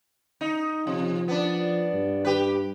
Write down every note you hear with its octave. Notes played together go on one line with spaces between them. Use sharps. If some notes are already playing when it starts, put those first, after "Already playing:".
D#4
C3 F3
B3 D4
G2
G4 B4